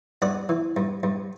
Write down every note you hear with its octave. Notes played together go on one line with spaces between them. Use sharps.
G2 D5 F#5
E3
G2
G2